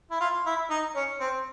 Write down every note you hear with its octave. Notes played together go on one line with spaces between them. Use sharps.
E4
F4
E4
D#4
C#4
C4